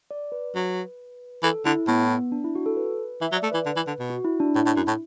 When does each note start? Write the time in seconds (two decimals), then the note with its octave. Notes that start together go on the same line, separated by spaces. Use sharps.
0.11 D5
0.32 B4
0.55 F#3
1.43 E3 A4
1.66 D3 E4
1.88 A2 B3
2.32 D4
2.44 E4
2.55 F#4
2.66 A4
2.77 B4
3.21 E3 E5
3.32 F#3
3.36 D5
3.43 A3
3.52 E3 B4
3.66 D3
3.76 E3
3.87 D3
4.00 B2
4.10 F#4
4.25 E4
4.40 D4
4.55 A2 E4
4.66 A2
4.76 F#2
4.88 A2